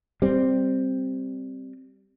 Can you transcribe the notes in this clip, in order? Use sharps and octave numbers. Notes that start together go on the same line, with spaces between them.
G3 C4